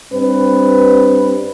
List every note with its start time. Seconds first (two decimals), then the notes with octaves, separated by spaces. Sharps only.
0.12 G2 C4 B4